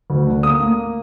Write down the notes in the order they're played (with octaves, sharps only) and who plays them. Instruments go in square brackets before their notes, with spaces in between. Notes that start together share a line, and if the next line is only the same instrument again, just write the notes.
[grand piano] D2
D3
A#3 D#6
A#3